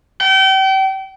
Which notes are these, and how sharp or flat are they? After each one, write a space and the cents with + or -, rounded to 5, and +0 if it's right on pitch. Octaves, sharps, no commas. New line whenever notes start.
G5 -35